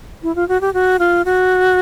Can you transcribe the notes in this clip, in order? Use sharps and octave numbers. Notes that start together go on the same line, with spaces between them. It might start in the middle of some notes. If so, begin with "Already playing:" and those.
E4
F4
F#4
G4
F#4
F4
F#4